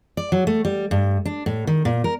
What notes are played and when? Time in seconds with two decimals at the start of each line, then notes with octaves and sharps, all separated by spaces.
0.17 D5
0.32 F#3
0.47 A3
0.65 G3
0.91 G2
1.25 D4
1.46 A2
1.67 D#3
1.85 A#2
2.04 A#4